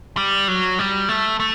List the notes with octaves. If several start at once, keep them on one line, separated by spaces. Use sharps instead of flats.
G3
F#3
G3
A3
A3